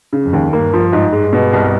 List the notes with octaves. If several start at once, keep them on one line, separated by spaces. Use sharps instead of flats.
C#3
F2
D#2
G2 A#3
F3
G#2
G2 G#3
B2
C2